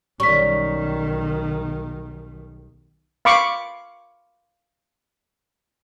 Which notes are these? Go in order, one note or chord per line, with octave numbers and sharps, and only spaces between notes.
B1 D#3 G3 C#4 C#6 B6
F5 B5 C#6 D6